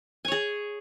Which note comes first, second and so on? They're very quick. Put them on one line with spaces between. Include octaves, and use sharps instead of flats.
G#5 C#5 G#4